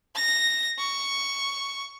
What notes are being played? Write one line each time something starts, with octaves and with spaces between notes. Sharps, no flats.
A#6
C#6